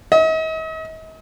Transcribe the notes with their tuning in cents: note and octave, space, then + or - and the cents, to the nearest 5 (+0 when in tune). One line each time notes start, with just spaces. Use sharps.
D#5 +45